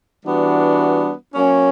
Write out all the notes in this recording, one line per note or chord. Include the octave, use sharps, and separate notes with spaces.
E3 G3 B3 D4 F#4
F#3 A#3 C#4